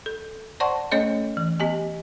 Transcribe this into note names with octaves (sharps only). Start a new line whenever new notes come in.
A4
C5 D5 F#5 A5 C6 C#6
A3 C#4 A4 C#5 D#5
E3
B3 G4 D#5 G#5